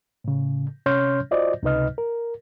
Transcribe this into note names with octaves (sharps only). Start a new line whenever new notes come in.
A2 C#3
C3 C#4 C#5 C6 F6 G6
F4 F#4 C5 D5 D#5
C#2 C3 D#4 B4 D#5 F6
A#4